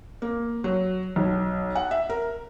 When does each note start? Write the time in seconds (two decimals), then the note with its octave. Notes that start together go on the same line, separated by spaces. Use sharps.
0.22 A#3
0.64 F#3
1.16 B1
1.75 F#5
1.91 E5
2.10 A#4